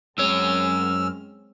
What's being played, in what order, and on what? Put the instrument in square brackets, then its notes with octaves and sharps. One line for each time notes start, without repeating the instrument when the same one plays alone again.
[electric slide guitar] F#2 C#5 [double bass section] G#3 C4 C#4 [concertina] E6 F6